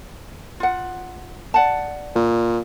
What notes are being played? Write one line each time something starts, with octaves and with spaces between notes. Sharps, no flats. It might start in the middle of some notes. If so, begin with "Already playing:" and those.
F4 F#5
D5 F#5 A5
A#2